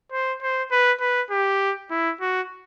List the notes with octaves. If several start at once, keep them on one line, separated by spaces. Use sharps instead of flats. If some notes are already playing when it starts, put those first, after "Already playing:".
C5
C5
B4
B4
G4
E4
F#4